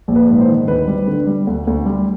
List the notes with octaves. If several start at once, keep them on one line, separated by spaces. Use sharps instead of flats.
A#1
B4
G#2
C5
D#3
D2 B4
G3
D3
G3
D2
D2
G3